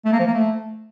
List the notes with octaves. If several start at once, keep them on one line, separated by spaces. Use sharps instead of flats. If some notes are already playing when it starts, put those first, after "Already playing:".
A3
A#3
F3
A#3
A3